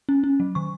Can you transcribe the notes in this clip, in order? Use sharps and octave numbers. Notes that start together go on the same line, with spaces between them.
C#4
C#4
F#3
D#3 C#6